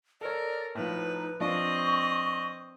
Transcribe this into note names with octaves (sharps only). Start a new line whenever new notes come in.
A4 A#4 C#5 D5
A2 F3 D#4 B4
F3 C4 D4 D#5 C#6